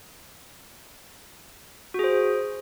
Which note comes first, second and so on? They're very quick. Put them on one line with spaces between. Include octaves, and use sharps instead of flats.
F#4 G#4 C5